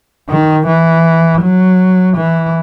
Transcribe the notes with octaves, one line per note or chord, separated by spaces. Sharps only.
D#3
E3
F#3
E3